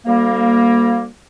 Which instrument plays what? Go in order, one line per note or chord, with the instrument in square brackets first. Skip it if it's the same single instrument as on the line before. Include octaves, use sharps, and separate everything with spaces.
[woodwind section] D2 G3 A#3